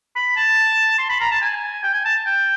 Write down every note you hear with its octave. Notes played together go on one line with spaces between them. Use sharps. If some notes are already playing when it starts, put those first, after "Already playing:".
B5
A5
C6
B5
A#5
A5
G#5
G5
G#5
A5
G5